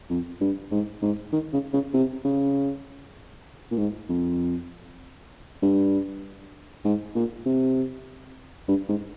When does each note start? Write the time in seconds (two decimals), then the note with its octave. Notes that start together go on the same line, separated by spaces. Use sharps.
0.10 F2
0.41 G2
0.71 G#2
1.02 G#2
1.32 D#3
1.53 C#3
1.73 C#3
1.94 C3
2.25 C#3
3.71 A#2
3.78 G#2
4.09 F2
5.62 G2
6.85 G#2
7.15 A#2
7.46 C3
8.68 G2
8.89 G#2